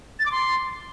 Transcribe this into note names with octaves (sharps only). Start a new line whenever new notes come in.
A6
D6
C6